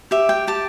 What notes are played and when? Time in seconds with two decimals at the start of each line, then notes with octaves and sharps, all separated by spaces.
0.11 G4 E5
0.29 G5
0.47 G4 A5